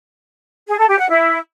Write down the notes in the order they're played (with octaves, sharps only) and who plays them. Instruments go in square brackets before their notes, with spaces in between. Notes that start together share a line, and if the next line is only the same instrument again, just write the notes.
[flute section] G#4
A4
G4
F#5
E4